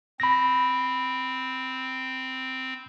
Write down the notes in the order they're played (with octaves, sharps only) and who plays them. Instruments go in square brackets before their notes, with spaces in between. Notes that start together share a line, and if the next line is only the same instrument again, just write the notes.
[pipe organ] C4 [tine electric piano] B5 A#6